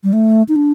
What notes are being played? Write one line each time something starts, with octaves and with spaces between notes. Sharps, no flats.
G3
A3
D#4
D4